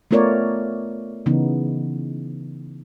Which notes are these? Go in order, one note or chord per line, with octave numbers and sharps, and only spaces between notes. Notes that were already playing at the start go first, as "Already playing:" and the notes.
A3 B3 F4 A#4 C#5 D5
C#3 E3 B3 D#4